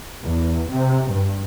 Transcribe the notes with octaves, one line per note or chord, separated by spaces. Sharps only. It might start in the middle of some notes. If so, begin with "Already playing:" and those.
E2
C3
G2